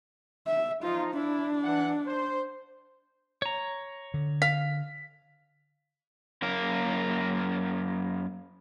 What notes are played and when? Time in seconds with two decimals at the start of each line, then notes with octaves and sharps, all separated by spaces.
0.47 E5
0.83 F3 D#4 F4
1.14 D4 E4
1.63 E3 F#5
2.07 C5
3.42 C#5 A#5
4.14 D3
4.42 F5 B6
6.42 F#2 A#3 A#4